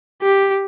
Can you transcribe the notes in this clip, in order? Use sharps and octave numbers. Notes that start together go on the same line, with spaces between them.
G4